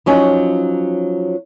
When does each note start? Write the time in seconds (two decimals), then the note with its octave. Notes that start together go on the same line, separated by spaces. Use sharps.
0.06 F3 F#3 C#4 D#4